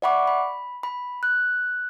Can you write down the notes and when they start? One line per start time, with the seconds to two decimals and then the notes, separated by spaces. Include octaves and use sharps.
0.02 D5 E5 F#5 B5 C#6 D6
0.28 B5
0.83 B5
1.23 F#6